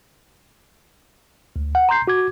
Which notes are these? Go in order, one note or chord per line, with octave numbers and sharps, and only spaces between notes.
D2
F#5
A#5 C6 G6 C7
F#4 D6 G#6